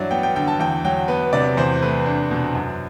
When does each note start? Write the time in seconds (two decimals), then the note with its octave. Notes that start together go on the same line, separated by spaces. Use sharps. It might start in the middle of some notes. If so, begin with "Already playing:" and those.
Already playing: G2 E3 F#3 D5 E5
0.11 B3 G5
0.23 G5
0.36 D3 G5
0.48 A5
0.60 E2 G5
0.85 F#3 G5
1.08 B3 B4
1.33 C3 D5
1.57 E2 C5
1.82 A3 B4
2.06 D4
2.31 B2
2.55 F#2